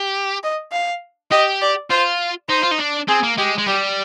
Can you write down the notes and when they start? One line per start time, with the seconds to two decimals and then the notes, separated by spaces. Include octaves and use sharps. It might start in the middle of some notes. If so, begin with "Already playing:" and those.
Already playing: G4
0.43 D#5
0.72 F5
1.31 G4 D#5
1.61 D5
1.90 F4 C5
2.49 D#4 C5
2.64 F4
2.72 D#4
2.79 D4
3.08 C4 G#4
3.23 A#3
3.38 G#3 G4
3.58 G#3
3.67 G3 G4